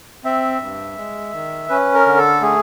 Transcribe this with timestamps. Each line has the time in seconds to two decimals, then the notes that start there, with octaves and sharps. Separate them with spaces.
0.24 C4 E5
0.61 G2
0.98 G#3
1.33 D#3
1.69 C#4 B4
1.94 A#4
2.06 D3
2.17 A4
2.41 A3 G#4